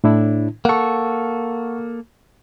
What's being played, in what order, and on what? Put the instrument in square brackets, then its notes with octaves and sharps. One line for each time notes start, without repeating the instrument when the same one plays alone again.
[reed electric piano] A2 D4 E4
[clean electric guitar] A#3 A4 [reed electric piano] F#5 C#6